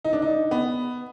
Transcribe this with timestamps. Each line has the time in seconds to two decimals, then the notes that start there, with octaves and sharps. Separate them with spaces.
0.05 D#4
0.13 D4
0.22 D#4
0.51 B3